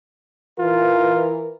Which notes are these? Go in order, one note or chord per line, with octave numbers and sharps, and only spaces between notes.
E3 F4 A#4